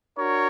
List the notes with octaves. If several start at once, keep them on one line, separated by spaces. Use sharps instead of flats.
D4 F#4 A#4 C#5